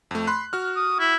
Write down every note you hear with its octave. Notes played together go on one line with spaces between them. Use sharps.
F2 A3
B5 C6 F#6
F#4 F6
D#6
E4